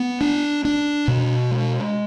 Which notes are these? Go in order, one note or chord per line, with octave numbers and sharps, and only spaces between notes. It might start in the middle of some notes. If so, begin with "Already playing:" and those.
Already playing: B3
D4
D4
B2
G#3